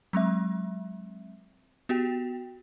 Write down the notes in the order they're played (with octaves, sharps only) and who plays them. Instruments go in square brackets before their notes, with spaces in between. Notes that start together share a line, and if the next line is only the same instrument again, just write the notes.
[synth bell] F#3 G#3 C4 E5
B3 F#4 G4 G5